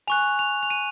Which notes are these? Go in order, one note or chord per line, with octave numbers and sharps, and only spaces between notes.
G#5 C#6 F#6 F7
F7
F7
D#7